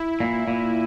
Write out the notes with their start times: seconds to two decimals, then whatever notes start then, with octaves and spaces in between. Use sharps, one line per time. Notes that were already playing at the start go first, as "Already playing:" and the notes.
Already playing: E4
0.20 A#2
0.48 A#2